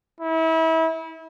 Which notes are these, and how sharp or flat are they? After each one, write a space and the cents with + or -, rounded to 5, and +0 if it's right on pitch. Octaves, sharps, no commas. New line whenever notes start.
E4 -30